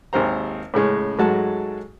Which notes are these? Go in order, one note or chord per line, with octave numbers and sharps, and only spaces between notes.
G#1 D#2 G4 C5 A#5
A2 C#3 G#3 C#4
G#2 F#3 G#3 A3 F#4 A5